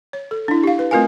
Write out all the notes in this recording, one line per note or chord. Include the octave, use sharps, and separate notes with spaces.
C#5
A4
D4 E4
G4 F5
B4
A3 C4 F4 A#4 F5 G#5